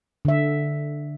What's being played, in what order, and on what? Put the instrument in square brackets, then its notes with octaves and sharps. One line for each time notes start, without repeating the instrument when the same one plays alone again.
[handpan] D3 E5